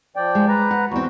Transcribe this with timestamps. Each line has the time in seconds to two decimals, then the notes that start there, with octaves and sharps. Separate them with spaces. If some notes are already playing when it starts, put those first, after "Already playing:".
0.16 F3 D5 G5
0.35 G#3
0.48 B4 A#5
0.71 F#5
0.91 E2 C4 F#4